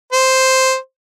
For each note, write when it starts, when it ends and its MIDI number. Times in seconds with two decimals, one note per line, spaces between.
0.13 0.76 72